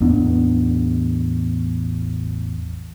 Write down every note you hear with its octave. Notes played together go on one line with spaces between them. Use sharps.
A1 E2 B3 D4